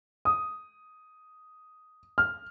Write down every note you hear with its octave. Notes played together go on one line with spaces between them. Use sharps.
D#6
F6